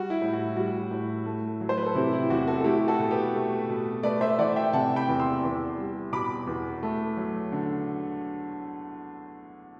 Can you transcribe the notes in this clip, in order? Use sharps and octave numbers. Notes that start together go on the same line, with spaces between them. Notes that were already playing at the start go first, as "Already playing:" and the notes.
Already playing: G3 F#4
E4
A2
F#4
G3 F#4
A2
A3
F#3
C5
B4
A4
C3 E4 G4
E4
E2 F#4
F#4 A4
A4
A3 E4 G4
F#4 A4
B2
G4 B4
A3
B2
A3 B4 D5
C5 E5
E3 D5 F#5
E5 G5
C3 F#5 A5
G5 B5
E2
C6 E6
E2
G3
B2 B5 D6
E2
A3
F#3
D3